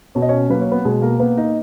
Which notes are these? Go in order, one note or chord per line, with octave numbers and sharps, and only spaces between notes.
B2 C#5
D#5
C#4 C#5
F#3 A#3 B4
C#5
B3 B4
B2 G#3 G#4
A#3 A#4
A#3 B3 B4
D#4 D#5